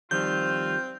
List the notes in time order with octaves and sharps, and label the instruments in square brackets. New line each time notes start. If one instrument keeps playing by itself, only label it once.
[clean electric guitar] D#3 F3 G3 [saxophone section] C4 [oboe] F4 [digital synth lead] G6